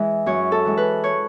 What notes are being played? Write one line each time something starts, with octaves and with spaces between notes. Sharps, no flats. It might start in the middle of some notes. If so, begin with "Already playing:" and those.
Already playing: E3 G#3 E5
F#2 C#5
A4
E3 G#3
B4
C#5